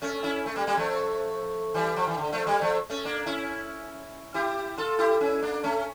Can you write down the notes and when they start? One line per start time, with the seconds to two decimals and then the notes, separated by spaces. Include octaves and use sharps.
0.02 A3 C#4
0.23 C#4 E4
0.46 A3
0.56 G3 A#3
0.67 G3 A#3
0.77 F3 A3
1.74 E3 G3
1.96 F3
2.07 E3
2.17 D3
2.32 F3 A3
2.46 G3 A#3
2.61 F3 A3
2.90 A3 C#4
3.05 A#3 D4
3.26 C#4 E4
4.34 E4 G4
4.78 F4 A4
4.99 E4 G4
5.21 C#4 E4
5.42 A#3 D4
5.64 A3 C#4